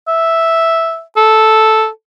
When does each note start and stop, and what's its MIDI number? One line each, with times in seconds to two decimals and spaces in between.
0.08 1.02 76
1.17 1.88 69